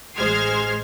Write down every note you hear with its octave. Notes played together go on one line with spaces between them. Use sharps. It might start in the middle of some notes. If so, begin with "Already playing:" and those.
A1 G#3 C5 F6 G#6 C7